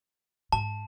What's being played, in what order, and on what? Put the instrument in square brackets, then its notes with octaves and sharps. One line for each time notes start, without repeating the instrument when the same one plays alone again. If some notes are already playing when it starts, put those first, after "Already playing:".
[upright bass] G#2 [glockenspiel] A5